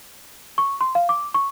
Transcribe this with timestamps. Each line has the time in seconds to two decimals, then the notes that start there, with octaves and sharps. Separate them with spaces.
0.58 C#6
0.81 C6
0.95 F5
1.09 D6
1.34 C#6